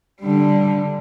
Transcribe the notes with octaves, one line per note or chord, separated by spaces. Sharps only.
D3 G3